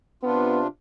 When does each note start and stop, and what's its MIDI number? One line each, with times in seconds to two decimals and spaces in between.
0.23 0.67 48
0.23 0.62 59
0.23 0.67 62
0.23 0.67 65